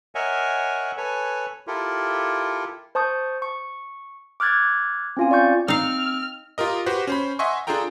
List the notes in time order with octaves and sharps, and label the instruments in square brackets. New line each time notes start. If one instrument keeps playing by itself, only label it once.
[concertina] A#4 C#5 D#5 E5 F#5 G#5
A4 B4 C#5 G#5
E4 F4 G4 A4 A#4
[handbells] C5 A5 C#6 D#6 G6
C#6
D6 F6 F#6 G#6 A6
C4 C#4 F4 F5 G#5
D5 F5 C#6 G6
[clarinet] C4 [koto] D#4 F5 [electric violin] F6
[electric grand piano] F4 G4 A#4 D#5
F#4 G4 B4 C5
C#4 C5 B5
D#5 E5 F#5 G#5 C6 C#6
D4 F4 G#4 A4 G5 A#5